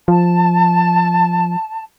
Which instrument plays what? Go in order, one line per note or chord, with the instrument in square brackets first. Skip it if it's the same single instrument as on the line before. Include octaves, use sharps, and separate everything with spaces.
[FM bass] F3 [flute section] A5